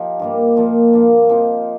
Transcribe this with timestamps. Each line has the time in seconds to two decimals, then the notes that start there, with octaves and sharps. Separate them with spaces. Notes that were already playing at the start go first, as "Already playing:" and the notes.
Already playing: F3 D#4 G4
0.19 G2 G3 A#3
0.56 A#2 F3 A#3 F4
0.93 G2 F3 A#3
1.29 F3 C4 D#4